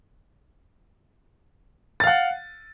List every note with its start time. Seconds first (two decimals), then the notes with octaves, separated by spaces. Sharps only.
2.00 A6
2.04 F5
2.07 F#5